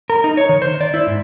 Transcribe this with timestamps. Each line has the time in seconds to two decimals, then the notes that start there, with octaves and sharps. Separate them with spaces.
0.10 A#4
0.24 D#4
0.37 C#5
0.49 D#3
0.62 C5
0.81 D5
0.94 E4
1.07 G#2